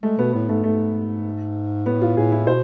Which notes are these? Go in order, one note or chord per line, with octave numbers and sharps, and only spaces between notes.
G#3 A3
B2 B3
A2 B3
G#2 A3
G#2 A3
A2 B3
F4
A2 G#4
E4
B2 C5